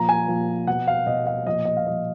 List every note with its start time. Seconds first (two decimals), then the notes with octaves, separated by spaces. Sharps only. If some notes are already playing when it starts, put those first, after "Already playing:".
Already playing: A#2 F3 A#5
0.09 G#5
0.28 A#2 F3
0.67 B2 F#5
0.87 F5
1.06 B2 D#5
1.27 F5
1.46 A#2 F3 D#5
1.65 D#5
1.77 F5
1.85 A#2 F3 D#5